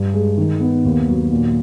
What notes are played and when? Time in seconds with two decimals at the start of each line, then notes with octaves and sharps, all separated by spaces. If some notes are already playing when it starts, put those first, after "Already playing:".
Already playing: G2
0.14 G#3
0.37 D#3
0.60 B3
0.85 D#2
1.07 F#3
1.31 A#2